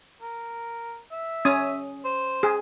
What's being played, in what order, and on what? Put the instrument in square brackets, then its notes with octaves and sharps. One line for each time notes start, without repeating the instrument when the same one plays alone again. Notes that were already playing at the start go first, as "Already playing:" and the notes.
[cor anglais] A#4
E5
[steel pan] C#4 D#6
[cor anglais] C5
[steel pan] G#4